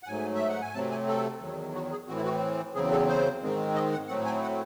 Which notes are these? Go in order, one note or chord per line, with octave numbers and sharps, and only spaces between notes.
F#5
G#2 F#3 A3 G#5
E5
F#5
G#5
C3 F#3 A3 C4 A5
G#5
A4
E2 D#3 F#3
F#4
G#4
A2 E3 C4 F#4
E4
F#4
E2 C#3 F#3 C4 G#4
A4
C5
G#2 D#3 G#3 C4
D#5
F#5
A2 F#3 A3 C4 F#5
G#5
F#5